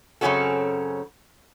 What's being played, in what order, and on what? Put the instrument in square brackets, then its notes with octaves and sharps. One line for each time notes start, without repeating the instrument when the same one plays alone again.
[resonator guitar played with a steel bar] F#2 C#3 C4 C#4 F#4 A4